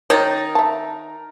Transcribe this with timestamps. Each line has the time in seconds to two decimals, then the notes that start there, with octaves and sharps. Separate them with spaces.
0.10 D#3 D#4 A#4 C#5 A#5 A6
0.55 E5 A5